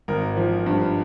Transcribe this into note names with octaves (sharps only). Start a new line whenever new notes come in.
G#1 A#4
F3
G2